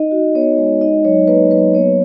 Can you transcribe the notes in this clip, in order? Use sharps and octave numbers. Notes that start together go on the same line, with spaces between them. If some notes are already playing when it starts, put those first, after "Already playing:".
Already playing: D#4 D#5
F#4
B3 C#5
G#3
D#4 D#5
F#3 C#5
A#3 B4
F#3 B4
B3 C#5